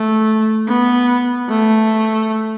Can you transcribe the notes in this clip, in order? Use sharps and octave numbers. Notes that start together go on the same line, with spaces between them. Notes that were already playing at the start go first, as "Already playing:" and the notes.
Already playing: A3
B3
A3